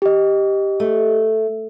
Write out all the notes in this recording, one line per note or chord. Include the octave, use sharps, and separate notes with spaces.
G4 D#5
A3